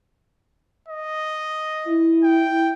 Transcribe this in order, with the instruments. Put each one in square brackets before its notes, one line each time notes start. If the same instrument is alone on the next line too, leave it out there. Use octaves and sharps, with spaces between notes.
[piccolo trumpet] D#5
[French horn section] E4
[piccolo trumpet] G5